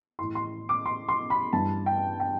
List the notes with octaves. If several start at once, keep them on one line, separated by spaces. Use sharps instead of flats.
A2 E3 C6
C6
D6
C6
C6
B5
G2 E3 A5
G5
G5